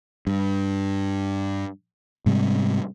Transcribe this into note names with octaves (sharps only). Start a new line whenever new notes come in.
G2
G#2 C3 G3